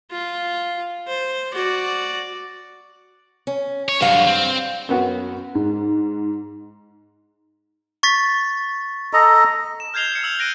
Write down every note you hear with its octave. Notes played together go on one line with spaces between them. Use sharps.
F4
C5
F#4 D5
C#4
C#5
G2 D3 F#3 F5
C4
F#2 B3 F#4
G#2
C#6 A6 B6
A4 D#5 A#5
E7
F6 G6 G#6 C7 F7 G7
G#6 C7 C#7
E6 F#7
F#6 A#6 D7 D#7 F7